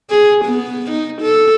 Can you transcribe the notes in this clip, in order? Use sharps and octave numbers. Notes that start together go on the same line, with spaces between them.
G#4
B3
D#4
A4